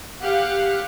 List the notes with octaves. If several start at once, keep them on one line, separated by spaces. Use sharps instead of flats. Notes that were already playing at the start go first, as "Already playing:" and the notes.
G4 F5 F#5